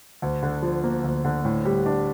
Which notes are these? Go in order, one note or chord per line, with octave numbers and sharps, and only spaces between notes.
D2
D3
F3
A#3
D2
D3
A2
G3
D4